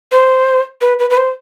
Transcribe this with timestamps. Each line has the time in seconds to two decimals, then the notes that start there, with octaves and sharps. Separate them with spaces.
0.12 C5
0.81 B4
0.99 B4
1.10 B4
1.17 C5